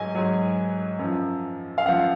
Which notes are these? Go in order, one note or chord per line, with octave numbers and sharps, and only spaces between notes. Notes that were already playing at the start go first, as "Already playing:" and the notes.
Already playing: G#2 F#3 D#5 G#5
G#2 F#3
F#2 F3
F5
F#2 F3 F#5